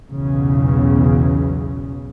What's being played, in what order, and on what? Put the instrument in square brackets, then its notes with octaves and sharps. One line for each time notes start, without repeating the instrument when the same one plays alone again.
[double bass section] B1 E2 C#3